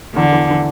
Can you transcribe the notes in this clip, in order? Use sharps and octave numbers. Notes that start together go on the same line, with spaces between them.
E2 D3 E3
E2 E3
E3